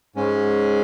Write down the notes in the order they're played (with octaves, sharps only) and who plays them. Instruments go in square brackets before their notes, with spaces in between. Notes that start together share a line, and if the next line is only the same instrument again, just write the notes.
[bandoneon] G#2 G#3 C#4